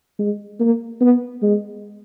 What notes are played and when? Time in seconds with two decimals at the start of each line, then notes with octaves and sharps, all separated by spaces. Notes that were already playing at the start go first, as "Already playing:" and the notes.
0.19 G#3
0.60 A#3
1.01 B3
1.42 G#3